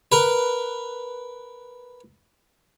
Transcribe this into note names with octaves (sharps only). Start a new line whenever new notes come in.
A#4 B4